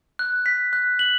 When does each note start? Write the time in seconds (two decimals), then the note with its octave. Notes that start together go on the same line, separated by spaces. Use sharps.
0.19 F#6
0.46 B6
0.73 F#6
0.99 F#7